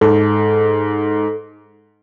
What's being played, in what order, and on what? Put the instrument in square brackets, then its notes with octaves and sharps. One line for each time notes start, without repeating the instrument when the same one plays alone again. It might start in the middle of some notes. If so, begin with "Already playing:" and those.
[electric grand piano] G#2 [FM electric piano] A4